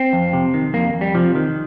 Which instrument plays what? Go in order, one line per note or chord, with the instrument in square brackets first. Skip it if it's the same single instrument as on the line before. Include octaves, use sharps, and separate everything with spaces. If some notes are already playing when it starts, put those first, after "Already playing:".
Already playing: [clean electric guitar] C4
F2
C3
D#3
F2 A#3
F2
G3
C3 F3
D#3